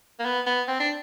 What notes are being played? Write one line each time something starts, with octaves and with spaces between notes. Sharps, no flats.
A#3
B3
B3
C4
D4